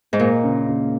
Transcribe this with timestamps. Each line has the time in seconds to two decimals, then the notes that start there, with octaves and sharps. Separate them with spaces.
0.13 G#2
0.19 A#2 A#3
0.44 C#3
0.68 C#3